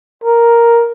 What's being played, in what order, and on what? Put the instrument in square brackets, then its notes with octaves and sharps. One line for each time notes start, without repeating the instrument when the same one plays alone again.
[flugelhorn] A#4